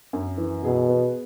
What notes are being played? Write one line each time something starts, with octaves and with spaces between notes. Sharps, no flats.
F#2
E3
B2 G#4
B3